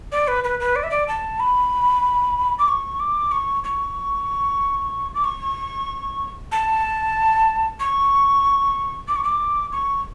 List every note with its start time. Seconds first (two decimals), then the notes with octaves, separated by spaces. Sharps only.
0.12 D5
0.28 B4
0.44 B4
0.60 B4
0.76 D5
0.83 E5
0.91 D5
1.08 A5
1.40 B5
2.59 D6
2.68 C#6
3.00 D6
3.32 C#6
3.64 C#6
5.15 D6
5.24 C#6
6.52 A5
7.80 C#6
9.08 D6
9.16 C#6
9.24 D6
9.72 C#6